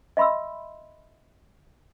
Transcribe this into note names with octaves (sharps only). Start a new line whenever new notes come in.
D#5 E5 B5 C6 E6